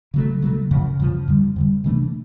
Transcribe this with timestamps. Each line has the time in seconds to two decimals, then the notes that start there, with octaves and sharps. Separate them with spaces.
0.14 C#3 F#3 A3
0.42 C#3 F#3 A3
0.71 F#2 C#3 F3
1.00 F#2 C#3 F3
1.28 F2 D3 G3
1.56 F2 D3 G3
1.84 C3 E3 A3 D4